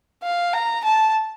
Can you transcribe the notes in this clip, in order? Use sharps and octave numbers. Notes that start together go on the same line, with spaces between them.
F5
A#5
A5